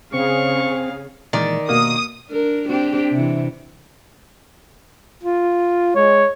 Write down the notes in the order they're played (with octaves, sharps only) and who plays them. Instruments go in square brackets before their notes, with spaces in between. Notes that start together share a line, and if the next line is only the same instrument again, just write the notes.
[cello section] C#3 G#4 [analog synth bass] C4 [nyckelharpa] F5 [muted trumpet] C#6
[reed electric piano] A#2 E3 G#3 [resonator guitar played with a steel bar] D#3 D5
[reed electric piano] B2 D#4 F#4 [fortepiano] A#3 [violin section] D#6
[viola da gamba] D4 A#4
C4 D4 G4
C3 E3
[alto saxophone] F4
[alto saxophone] G#3 [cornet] C#5